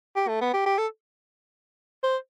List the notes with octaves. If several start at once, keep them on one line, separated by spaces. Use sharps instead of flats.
G4
A3
B3
G4
G4
A4
C5